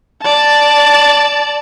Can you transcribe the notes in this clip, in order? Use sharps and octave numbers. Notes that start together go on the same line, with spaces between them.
D5 A5